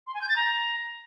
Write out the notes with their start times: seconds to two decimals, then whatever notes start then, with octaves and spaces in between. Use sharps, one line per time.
0.07 C6
0.14 G#5
0.22 G6
0.29 A6
0.36 A#5